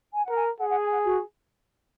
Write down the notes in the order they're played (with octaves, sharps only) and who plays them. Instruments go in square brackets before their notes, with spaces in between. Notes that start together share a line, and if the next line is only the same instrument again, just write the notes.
[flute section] G#5
[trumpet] A#4 [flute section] F#5
[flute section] G#5
[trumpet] G#4 [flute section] F#5
[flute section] F#5
G#5
F#5
F#4